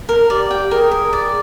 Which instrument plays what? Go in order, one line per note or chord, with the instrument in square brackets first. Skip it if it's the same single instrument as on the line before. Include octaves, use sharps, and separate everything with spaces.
[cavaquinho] A#4
[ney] G4 [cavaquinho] D5
[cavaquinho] G5
[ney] G#4 [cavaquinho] A#4
[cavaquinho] A#4
D5